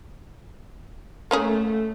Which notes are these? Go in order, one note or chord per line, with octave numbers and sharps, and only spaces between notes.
A3 A#3 C#4 G#4